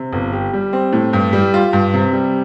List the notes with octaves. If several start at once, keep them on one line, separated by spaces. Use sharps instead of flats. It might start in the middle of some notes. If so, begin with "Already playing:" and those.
Already playing: C3
G1
G4
G3
C4
A2
G2
G3
F4
G2
C3
G3